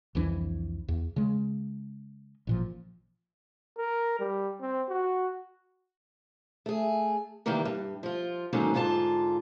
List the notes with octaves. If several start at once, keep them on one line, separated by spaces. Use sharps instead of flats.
C2 F2 E3 D4
E2
C#3 G#3
A1 A#2 F3
A#4
G3
C4
F#4
A3 G#4
C3 D#3 E3 G3 A#3
G2
F3 F4
G#2 D3 D#3 F#3 A#3 C#4
G#2 D3 F4 B4 A5